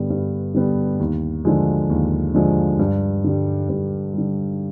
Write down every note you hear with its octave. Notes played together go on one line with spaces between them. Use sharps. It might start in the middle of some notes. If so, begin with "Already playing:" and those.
Already playing: G2 D3 G3 B3 D4
G2
D3 G3 B3 D4
D#2
D3 F3 G#3
D#2
D3 F3 G#3
G2
D3 G3
G2
D3 G3